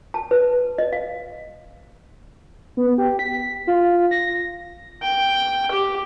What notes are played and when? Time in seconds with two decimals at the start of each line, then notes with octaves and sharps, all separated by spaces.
0.14 A5
0.31 B4
0.78 D#5
0.93 F5
2.77 B3
2.98 G4
3.19 B6
3.67 F4
4.11 A#6
5.02 G5
5.72 G4